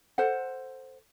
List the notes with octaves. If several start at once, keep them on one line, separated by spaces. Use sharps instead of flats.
A4 C5 F#5